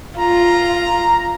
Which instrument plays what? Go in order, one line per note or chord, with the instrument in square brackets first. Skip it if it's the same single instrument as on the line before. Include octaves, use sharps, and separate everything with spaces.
[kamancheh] F4 [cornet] A#5